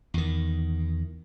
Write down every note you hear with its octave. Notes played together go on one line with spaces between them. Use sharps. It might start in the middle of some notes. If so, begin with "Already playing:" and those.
E2 D#3